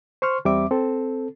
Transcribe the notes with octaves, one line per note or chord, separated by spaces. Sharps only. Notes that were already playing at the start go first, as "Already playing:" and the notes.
C5 C6 C#6 F6
E2 G3 C4 E5 D6
C4 A4